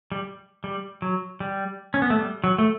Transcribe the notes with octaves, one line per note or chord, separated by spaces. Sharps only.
G3
G3
F#3
G3
C#4
B3
A3
G3
F#3
A3